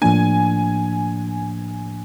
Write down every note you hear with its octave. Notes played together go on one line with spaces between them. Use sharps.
A2 F3 A#3 D4 G#5